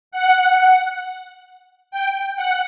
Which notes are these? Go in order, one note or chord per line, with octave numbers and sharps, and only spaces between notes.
F#5
G5
F#5